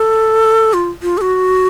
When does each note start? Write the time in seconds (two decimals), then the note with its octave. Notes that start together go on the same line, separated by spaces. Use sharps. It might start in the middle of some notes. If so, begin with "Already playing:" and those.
Already playing: A4
0.73 F4
1.02 F4
1.18 A4
1.21 F#4